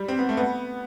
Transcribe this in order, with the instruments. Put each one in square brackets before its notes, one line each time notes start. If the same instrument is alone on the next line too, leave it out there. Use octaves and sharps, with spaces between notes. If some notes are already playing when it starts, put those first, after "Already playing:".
Already playing: [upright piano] G3
C4
B3
A3
B3